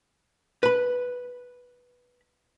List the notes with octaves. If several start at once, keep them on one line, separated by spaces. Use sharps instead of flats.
B4 B5